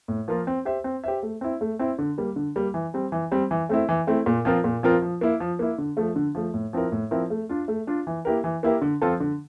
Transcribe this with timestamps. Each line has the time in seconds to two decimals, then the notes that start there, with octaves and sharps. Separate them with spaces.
0.08 A2
0.28 F3 A#3 F4 A#4
0.47 C4
0.65 G4 C5 E5
0.84 C4
1.04 G4 C5 E5
1.23 A3
1.41 C4 E4
1.61 A3
1.79 C4 E4
1.99 D3
2.18 G3 A#3
2.36 D3
2.56 G3 A#3
2.74 E3
2.94 G3 C4
3.12 E3
3.32 G3 C4
3.51 E3
3.69 A3 C4 E4
3.89 E3
4.07 A3 C4 E4
4.26 A#2
4.45 F3 C4 F4 A#4
4.64 A#2
4.83 F3 C4 F4 A#4
5.02 F3
5.21 A#3 E4
5.40 F3
5.59 A#3 E4
5.78 D3
5.97 F3 A3
6.16 D3
6.35 F3 A3
6.54 A2
6.73 F3 C4 E4 A#4
6.92 A2
7.11 F3 C4 E4 A#4
7.30 A3
7.49 D4 F4
7.68 A3
7.87 D4 F4
8.07 E3
8.25 A#3 E4 G4 A#4
8.44 E3
8.63 A#3 E4 G4 A#4
8.82 D3
9.02 F3 C4 F4 A4
9.20 D3